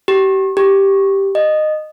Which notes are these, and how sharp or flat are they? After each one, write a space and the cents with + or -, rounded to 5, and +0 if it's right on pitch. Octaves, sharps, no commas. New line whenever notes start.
G4 -30
G4 +0
D#5 -15